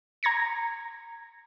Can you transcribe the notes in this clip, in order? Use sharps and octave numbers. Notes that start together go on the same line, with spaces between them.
A#5 G#6 A#6 C#7